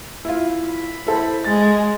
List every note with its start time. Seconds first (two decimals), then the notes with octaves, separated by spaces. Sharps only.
0.25 E4 F4
0.66 B5
1.07 E4 A4 C5
1.44 G#3 A6